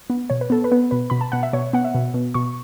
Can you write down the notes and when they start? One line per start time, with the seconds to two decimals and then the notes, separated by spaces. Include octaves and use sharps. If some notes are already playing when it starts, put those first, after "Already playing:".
0.10 B3
0.30 B2 C#5
0.41 B4
0.50 B3 A4
0.64 B4
0.72 B3
0.91 B2 B4
1.10 B2 B5
1.21 A5
1.32 B2 F#5
1.43 E5
1.53 B2 C#5
1.73 B3 F#5
1.84 E5
1.95 B2
2.14 B2
2.34 B2 C#6